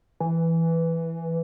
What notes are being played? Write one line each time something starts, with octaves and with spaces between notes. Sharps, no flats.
E3